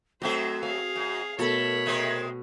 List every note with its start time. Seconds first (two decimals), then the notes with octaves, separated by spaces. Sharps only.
0.22 F#2 F#3 A3 C4 F#4 C5 D#5 E5
0.63 G#4 F5 G#5
0.96 F#2
1.39 B2 A3 A4 A#4 C#5 B5
1.86 C3 G#3 C4